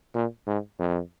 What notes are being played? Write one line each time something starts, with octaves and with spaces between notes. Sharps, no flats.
A#2
G#2
F2